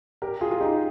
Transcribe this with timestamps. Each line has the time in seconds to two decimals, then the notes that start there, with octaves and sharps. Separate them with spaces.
0.22 G4 A#4
0.41 F4 G#4
0.51 F4
0.60 D#4 G4